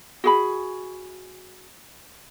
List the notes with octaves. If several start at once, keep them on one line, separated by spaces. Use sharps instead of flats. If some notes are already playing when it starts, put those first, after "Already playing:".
F#4 G#4 B5